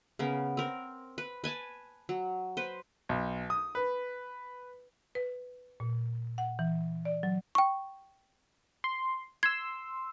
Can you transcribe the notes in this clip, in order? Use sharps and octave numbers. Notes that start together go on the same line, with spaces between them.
C#3 B3 A#4
C4 A#4
B4
B4 G#5 A5
F#3
B4 C5
B1
D#6
B4
B4
A#2
F#5
E3
D5
F#3
G5 C#6
C6
C6 E6 G#6